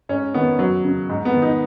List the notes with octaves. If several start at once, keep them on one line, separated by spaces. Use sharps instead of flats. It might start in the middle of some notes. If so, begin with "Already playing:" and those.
G#2 C#4
D#3 B3
F#2 F#3
C#3
G#2
B3
D#3
D#4